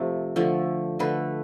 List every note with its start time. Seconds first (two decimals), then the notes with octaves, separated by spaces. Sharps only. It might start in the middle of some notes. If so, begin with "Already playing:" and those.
Already playing: C3 F3 A3
0.36 D3 F3 A3
0.99 D3 A3 B4